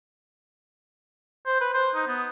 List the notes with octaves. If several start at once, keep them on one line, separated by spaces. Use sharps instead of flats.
C5
B4
C5
D#4
B3